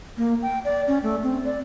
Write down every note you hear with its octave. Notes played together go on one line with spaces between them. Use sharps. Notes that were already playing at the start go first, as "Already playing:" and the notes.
A#3
G5
D5
C#4
A3
C4
D5